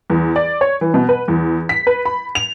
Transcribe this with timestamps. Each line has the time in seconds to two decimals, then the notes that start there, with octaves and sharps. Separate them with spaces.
0.10 E2
0.36 D5
0.61 C#5
0.81 E3
0.94 B2
1.09 B4
1.28 E2
1.69 B6
1.87 B4
2.05 B5
2.35 F7